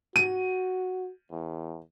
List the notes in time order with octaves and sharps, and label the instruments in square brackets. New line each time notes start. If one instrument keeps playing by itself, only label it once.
[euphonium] F#4 [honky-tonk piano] D#7
[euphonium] E2